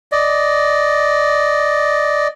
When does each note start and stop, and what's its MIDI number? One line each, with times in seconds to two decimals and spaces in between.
0.12 2.28 74
0.12 2.28 75